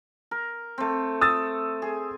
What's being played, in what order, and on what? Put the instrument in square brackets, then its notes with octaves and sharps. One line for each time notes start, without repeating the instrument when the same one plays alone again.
[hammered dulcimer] A#4
A3 C4
[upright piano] D#6 E6 A6
[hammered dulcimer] G#4